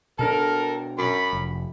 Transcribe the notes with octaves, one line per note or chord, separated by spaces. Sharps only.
B2 D4 A4 A#4
F#2 B5
F1